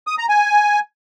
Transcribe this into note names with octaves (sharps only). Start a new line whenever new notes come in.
D#6
A#5
G#5